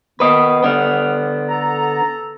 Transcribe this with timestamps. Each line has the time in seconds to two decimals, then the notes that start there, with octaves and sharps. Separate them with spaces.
0.20 D#3 B3 B4 D#5
0.63 D3 B3 F6
1.48 A4 A#5